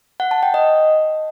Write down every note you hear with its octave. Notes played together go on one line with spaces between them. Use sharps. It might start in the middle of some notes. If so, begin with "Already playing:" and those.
F#5
A5
G5
D#5